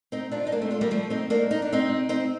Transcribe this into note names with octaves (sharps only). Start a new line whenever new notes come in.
C4 D#4
D4 F4
D#4
A#3 D4
A3 C4
D4 F4
G3 A#3
F3 A3
C4 D#4
A#3 D4
D#4
D4
C4 D#4
C4 D#4